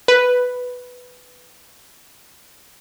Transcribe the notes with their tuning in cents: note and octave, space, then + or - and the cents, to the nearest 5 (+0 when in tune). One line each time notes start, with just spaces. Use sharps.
B4 +5